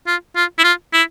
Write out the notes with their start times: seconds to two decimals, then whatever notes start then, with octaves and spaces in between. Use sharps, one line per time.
0.07 F4
0.36 F4
0.59 E4
0.64 F4
0.93 E4